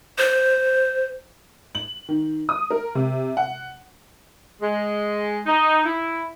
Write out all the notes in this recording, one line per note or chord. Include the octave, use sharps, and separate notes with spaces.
C5
F#7
D#3
D#6
A#4
C3
F#5
G#3
D#4
E4